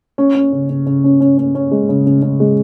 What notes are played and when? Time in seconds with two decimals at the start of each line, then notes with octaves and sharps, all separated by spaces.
0.18 C#4
0.35 C#4
0.52 C#3
0.70 C#3
0.86 C#3
1.04 C#4
1.20 C#4
1.38 C#4
1.55 C#4
1.71 G#3
1.89 C#3
2.06 C#3
2.22 C#3
2.40 G#3